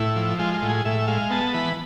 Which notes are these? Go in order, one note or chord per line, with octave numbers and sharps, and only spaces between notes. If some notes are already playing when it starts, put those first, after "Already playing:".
Already playing: A2 E4
F3
G#3 F4
F4
A2
G#4
A2 E5
G#3 F5
B3 A5
E3 B5